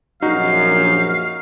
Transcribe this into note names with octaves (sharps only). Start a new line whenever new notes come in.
A#1 F#2 D#4 F#4 F5